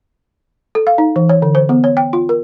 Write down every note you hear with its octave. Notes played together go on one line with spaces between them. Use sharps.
A4
F5
D#4
E3
C#5
D3
C5
B3
C#5
G5
F4
A#4